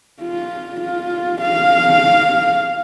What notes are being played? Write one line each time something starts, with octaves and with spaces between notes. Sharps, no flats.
F4
F4
F5